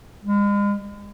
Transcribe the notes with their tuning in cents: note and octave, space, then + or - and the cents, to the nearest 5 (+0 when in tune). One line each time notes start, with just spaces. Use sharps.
G#3 -40